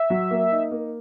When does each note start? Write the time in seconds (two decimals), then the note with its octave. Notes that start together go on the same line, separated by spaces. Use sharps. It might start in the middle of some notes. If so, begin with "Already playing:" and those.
Already playing: E5
0.10 F#3
0.31 A#3
0.52 D#4
0.71 A#3